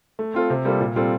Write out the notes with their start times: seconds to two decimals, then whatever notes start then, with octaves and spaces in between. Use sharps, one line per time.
0.19 A3
0.34 C4 F4 A4
0.50 C3
0.65 G3 A#3 F4 A4
0.81 A#2
0.96 G3 C4 F4 A4